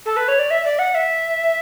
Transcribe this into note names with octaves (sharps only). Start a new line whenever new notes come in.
A4
B4
C#5
D5
E5
D5
F#5
E5